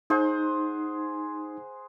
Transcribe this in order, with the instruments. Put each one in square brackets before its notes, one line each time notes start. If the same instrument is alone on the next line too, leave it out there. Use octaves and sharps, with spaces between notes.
[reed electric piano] D#4 [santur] G#4 C5 F#5